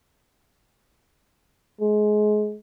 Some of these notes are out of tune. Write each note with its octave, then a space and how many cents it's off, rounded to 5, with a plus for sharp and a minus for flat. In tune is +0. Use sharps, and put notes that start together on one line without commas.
G#3 +25